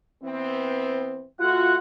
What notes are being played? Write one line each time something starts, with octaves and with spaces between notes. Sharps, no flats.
E3 B3 C4
A3 F4 F#4 F#5